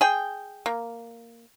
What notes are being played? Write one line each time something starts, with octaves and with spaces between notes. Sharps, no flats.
G#4 G5
A#3